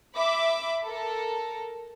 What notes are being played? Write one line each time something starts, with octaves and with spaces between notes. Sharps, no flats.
E5 B5 D6
A4 A#4